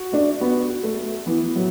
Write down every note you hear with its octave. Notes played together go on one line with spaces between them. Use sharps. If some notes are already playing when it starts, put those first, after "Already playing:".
Already playing: F#4
A3 D4
B3 F#4
F#4
A3
A3
E3 B3
A2 F#3